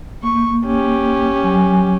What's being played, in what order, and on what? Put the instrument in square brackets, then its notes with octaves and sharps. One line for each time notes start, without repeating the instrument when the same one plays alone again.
[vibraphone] A#3 [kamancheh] C#6
[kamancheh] C#4 G4
[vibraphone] F#3 G#5